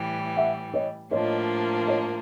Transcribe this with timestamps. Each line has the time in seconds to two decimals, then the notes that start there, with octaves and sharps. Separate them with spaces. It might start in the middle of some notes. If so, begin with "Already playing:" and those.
Already playing: A2 E3 G3
0.36 E5 F#5
0.74 C#5 D#5
1.11 A2 F3 A#3 D4 C#5 D#5
1.87 C#5 D#5